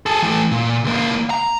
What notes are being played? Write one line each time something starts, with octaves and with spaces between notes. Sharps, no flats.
G#4 A4
E3 A3
A#2
C#2 A#3
A#5